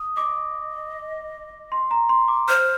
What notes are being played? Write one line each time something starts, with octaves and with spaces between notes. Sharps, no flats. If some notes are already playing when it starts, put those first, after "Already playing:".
Already playing: D#6
D#5 D6
C6
A#5
C6
D6
C5 F6